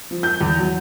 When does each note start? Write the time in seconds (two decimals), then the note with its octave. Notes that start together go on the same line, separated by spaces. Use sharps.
0.11 F3
0.23 G6
0.41 E2
0.59 F#3